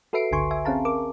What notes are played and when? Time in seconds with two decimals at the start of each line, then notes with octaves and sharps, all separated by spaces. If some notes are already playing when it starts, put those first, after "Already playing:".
0.13 F#4 A4 B4 E5 C7 D7
0.31 G1 C#2 D3 G#5 C6 C#6
0.51 E5 G#5
0.65 C4 C#4 G#4 F5 A5 A#5
0.85 A#4 D6